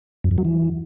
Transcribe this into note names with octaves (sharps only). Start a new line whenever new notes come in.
F#2
F2
F#3
E3